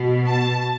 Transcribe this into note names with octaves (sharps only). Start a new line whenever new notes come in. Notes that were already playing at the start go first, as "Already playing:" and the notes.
Already playing: B2
A5